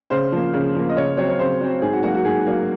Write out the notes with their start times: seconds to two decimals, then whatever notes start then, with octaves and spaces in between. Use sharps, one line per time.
0.10 C#3 C5
0.32 F3 A#3
0.54 C#3
0.75 F3 A#3
0.89 D#5
0.97 C#3 C#5
1.17 F#3 C4 C#5
1.29 C#5
1.39 C#3 C5
1.61 F#3 C4
1.82 G#2 G#4
1.93 F#4
2.03 F#3 A#3 F#4
2.14 F#4
2.25 G#2 G#4
2.46 F#3 A#3